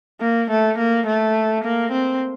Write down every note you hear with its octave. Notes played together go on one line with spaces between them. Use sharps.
A#3
A3
A#3
A3
A#3
C4